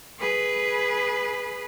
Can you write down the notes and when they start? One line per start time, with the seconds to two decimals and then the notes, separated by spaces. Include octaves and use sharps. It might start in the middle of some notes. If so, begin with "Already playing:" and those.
0.20 G#4 B4